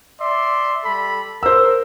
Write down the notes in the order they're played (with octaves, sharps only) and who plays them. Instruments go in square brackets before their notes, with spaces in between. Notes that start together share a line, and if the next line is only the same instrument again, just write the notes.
[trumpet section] D5 E5 C6
G3 A4 B5
[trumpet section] A#4 [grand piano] C5 E6